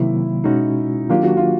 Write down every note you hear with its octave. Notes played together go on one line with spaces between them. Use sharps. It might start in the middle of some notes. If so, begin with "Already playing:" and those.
Already playing: C3 D#3 F#3 A#3 E4
B2 G#3 C#4 D#4 F#4
D#3 F#3 A#3 D4 F4 G4
F#4
F4